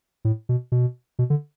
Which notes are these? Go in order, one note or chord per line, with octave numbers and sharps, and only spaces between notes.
A2
B2
B2
B2
D3